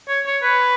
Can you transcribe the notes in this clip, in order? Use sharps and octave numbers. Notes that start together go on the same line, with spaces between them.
C#5
C#5
B4